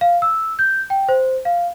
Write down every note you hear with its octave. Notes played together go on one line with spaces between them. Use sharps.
F5
E6
G6
G5
C5
F5